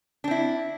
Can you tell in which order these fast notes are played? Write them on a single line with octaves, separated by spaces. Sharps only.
D4 C4 E4